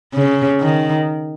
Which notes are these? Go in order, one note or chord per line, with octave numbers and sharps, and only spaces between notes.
C#3
D#3